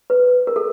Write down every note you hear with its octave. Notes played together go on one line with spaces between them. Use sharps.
B4
A#4
A4